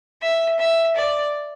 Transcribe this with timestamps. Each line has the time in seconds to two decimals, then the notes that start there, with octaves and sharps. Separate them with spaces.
0.22 E5
0.59 E5
0.96 D5